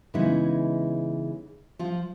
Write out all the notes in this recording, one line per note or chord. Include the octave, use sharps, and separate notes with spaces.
C#3 E3 G#3 B3 D#4 E4
F3 F4